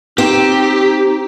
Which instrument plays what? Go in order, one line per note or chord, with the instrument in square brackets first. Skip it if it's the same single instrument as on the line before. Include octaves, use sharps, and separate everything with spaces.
[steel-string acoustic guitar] C4 [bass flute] D#4 [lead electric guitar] G4